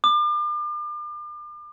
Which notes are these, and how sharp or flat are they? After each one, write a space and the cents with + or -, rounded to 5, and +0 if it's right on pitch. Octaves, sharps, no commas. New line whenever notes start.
D6 +40